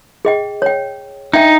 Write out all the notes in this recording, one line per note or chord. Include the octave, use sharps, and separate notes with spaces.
G#4 D#5 G5
C#5 G5
D4 D#4 E5 G5